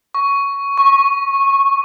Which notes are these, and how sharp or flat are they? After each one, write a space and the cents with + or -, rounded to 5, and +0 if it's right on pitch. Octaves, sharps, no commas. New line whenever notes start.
C#6 +10
C#6 -15